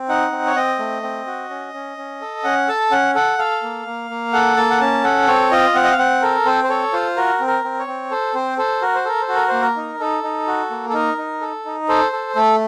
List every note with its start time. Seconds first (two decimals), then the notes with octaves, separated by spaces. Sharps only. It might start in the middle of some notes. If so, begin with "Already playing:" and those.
Already playing: C4
0.09 D#4 F#5
0.32 C4
0.46 C#5
0.56 C4 D#5
0.79 A3
1.03 C4
1.27 F#4
1.50 C#4
1.74 C#4
1.97 C#4
2.21 A4
2.44 C#4 F#5
2.68 A4 A5
2.91 C#4 F#5
3.15 A4 F#5
3.39 A4 F5
3.63 A#3
3.86 A#3
4.10 A#3
4.33 A4 F#5
4.57 A#3 A5
4.71 F#5
4.80 C#4 A5
5.04 A4 F#5
5.28 C4 C#5
5.51 F4 D#5
5.75 C4 F#5
5.84 D#5
5.91 F5
5.98 C4 F#5
6.22 A4 A#4
6.45 C4 C5
6.64 C5
6.69 A4 C#5
6.93 F4 C5
7.16 F#4 A#4
7.40 C4
7.47 A#4
7.64 C4
7.79 C#5
7.87 C4
8.11 A4 C5
8.34 C4 C5
8.58 A4 C5
8.82 F#4 A#4
8.95 C5
9.05 A4 A#4
9.22 C5
9.28 F#4
9.35 A#4
9.48 A#3 C5
9.62 A#4
9.76 D#4
10.00 D#4 A4
10.23 D#4
10.47 F#4
10.70 A#3
10.89 A4
10.93 D#4 A#4
11.18 D#4
11.41 A4
11.65 D#4
11.89 A4 C5
12.12 A4
12.35 A3 A4